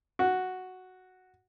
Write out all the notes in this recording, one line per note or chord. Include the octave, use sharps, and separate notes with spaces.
F#4